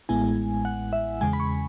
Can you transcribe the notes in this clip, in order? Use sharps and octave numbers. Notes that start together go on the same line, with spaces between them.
A1 A2 G#3 B3 E4 G#5
F#5
E5
E2 C#3 G#3 G#5
B5
C#6